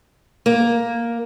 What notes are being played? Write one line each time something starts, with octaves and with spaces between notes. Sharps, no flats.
A#3